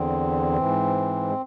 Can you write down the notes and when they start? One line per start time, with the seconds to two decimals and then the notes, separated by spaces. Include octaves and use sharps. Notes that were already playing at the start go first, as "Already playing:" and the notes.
Already playing: E2 D3 C4
0.56 G#2 E3
1.29 G#3